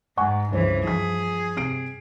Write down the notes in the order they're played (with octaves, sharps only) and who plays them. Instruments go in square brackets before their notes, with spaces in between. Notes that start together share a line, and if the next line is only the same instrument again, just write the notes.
[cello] G#2 [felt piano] F#5 G#5 C#6
[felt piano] C#2 C#4 C5 [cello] G2 E3
[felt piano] F3 B6 [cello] G#4
[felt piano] C3 C7 D7